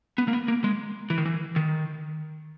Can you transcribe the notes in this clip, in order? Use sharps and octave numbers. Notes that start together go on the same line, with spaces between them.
B3
A#3
B3
A#3
G#3
E3
D#3
E3
D#3